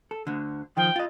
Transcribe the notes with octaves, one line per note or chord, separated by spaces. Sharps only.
A4
D2 D3
D#3 F3 G5
F4 D#5